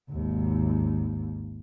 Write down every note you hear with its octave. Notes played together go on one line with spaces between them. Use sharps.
G#1 D#2